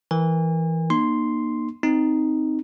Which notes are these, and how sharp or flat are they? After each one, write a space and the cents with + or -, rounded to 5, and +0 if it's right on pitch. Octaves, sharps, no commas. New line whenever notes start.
E3 -5 A#4 +0 G#5 -35
A#3 +35 D#4 -30 C6 +0
C4 -5 D#4 +0